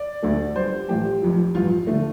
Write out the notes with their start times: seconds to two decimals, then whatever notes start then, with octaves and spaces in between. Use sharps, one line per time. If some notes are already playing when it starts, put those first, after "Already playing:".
Already playing: D5
0.22 D2 D3 A3
0.55 G1 G2 G3 C5
0.89 A1 A2 F3 A3 G4
1.22 F1 F2 F3
1.54 A1 G2 F3 F4
1.87 D3 F3 A3